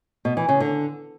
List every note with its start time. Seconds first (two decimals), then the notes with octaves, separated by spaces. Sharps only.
0.25 B2
0.37 E3
0.49 C#3
0.60 D3